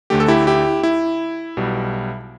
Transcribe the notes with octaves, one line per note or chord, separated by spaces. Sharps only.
D2 D3 A3 G4
A4
E4 G4
E4 G4
E4
B1 B2 G3